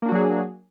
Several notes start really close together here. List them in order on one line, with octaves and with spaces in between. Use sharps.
A#3 D4 F#4 F#3 G#4